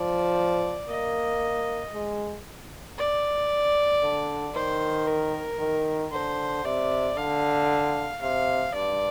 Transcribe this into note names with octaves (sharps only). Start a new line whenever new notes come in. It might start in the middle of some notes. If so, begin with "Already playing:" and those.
Already playing: F3 D5
A#3 D#5
G#3
D5
D3
D#3 C5
A#4
D#3
D3 C5
C3 D5
D3 F5
C3 F5
G2 D5